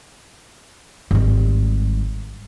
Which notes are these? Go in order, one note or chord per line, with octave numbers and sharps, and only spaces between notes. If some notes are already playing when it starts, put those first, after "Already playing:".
G#1 G3